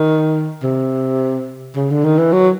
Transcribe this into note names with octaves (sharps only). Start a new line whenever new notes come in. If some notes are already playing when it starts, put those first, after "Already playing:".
Already playing: D#3
C3
C#3
D3
D#3
E3
F#3